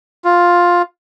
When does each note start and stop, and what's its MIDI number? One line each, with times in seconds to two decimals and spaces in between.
0.25 0.82 65